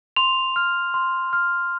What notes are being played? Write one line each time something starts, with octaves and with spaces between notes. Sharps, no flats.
C6 F7
F6
C6
F6